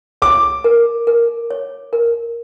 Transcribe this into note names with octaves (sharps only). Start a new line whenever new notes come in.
C#5 D6
A#4
A#4
C#5
A#4